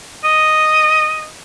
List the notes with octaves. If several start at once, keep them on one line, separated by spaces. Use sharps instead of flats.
D#5